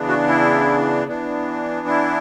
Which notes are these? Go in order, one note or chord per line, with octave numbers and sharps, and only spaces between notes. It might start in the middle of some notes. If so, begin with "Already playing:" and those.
Already playing: C#3 E3 B3 D4
F#4
E4
E3 B3 D4
E4